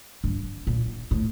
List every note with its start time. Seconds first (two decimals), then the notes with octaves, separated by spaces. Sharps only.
0.24 G2
0.67 A#2
1.11 A2